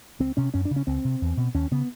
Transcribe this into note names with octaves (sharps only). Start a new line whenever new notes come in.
C#2 C4
C3 C#4
F#2 C#4
D4
C#3
C#4
C#2 C4
C3
E2
B2
D#2 C#4
C#3 B3